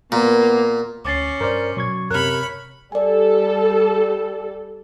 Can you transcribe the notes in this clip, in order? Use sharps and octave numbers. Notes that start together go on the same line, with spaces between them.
A#2 A#3 B3
D2 C#4 D6 A6 C7
G2 A#4 C5 D5
B2 F#3 C#6 G#6
F#2 C3 A#4 C#5 B5 F6 F#6
G3 A4 D5 G#5